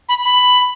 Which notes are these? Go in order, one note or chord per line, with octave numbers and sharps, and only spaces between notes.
B5
B5